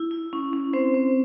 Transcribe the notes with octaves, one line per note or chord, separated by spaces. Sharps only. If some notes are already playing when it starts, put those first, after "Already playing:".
Already playing: E4
E4
C#4
C#4
C4 C5
C4